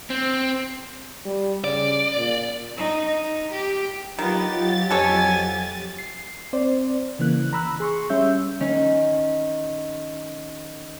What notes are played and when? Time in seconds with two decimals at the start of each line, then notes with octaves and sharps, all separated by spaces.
0.10 C4
1.26 G3
1.64 C#3 D5
2.17 A#2
2.77 D#4
3.06 D#4
3.52 G4
4.19 D#3 F#3 B3 F4 G4 A6
4.91 F2 B2 A4 C#5 G#5
5.98 C7
6.53 C4 C5 D5
7.19 C#3 E3 A#3 F#6
7.53 A#5 B5 E6 F#6
7.80 G#4 C6 C#6
8.10 G3 C#4 E5 E6 G6
8.60 D#3 C#4